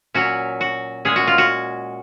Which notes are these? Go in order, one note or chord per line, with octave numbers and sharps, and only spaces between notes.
A#2 F#3 C#4 F#4
F#4
A#2 G#3 C#4 G#4
F#4
F4
F#4